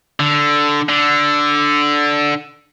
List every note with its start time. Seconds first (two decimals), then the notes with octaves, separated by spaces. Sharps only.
0.20 D3
0.89 D3